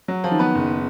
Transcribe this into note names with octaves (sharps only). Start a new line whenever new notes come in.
F#3
F3 F4
D#3
B3 B4
F#1